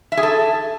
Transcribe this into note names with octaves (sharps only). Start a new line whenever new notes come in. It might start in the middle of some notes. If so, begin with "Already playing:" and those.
E5
G#4
A4